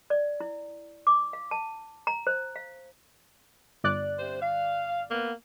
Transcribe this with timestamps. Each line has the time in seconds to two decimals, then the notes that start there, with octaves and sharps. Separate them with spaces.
0.10 D5
0.40 E4
1.07 D6
1.33 F5
1.51 A5
2.07 A#5
2.27 C5
2.56 F5
3.84 G1 D5 F#6
4.18 C3 C5
4.41 F5
5.11 A#3 B3